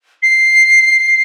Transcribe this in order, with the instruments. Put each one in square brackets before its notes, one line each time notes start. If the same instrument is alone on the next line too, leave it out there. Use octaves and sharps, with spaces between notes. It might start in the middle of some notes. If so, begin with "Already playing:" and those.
[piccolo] C7